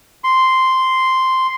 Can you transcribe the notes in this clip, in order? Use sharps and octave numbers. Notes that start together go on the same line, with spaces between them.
C6